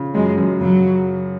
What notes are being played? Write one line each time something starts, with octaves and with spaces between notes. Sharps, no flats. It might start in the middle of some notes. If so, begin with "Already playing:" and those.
Already playing: C#3 F3
F#2 G#3
F#2
C#3 F#3